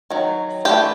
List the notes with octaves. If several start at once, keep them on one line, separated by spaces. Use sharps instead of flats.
D#3 F#3
E3 A3 D4 G4 G5